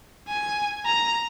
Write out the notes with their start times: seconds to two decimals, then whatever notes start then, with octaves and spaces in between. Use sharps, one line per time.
0.28 G#5
0.86 A#5